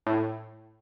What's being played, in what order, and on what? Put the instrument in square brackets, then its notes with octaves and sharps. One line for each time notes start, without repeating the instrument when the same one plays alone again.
[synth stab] A2